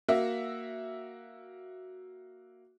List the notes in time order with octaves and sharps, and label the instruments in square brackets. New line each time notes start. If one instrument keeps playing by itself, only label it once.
[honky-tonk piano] A#3 F#4 E5